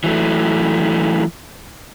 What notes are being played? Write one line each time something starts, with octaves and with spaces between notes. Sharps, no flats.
E3 F#3 A3